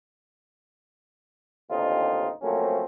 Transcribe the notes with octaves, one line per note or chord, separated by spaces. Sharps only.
A1 D#2 D3 C4 D#4 F4
F3 F#3 A3 A#3 C4 C#4